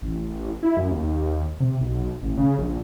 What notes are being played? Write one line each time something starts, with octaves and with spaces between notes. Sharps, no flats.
A1
E4
F#2
D#2
C3
B1
A1
C#3
A#1